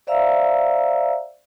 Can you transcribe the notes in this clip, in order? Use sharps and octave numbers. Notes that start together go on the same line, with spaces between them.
C5 D5 E5 F5 A#5 E6